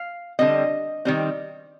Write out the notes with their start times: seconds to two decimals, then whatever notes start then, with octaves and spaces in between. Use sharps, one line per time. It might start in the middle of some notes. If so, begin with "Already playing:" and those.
Already playing: F5
0.39 D3 G3 C4 D#5
1.05 D#3 G3 C4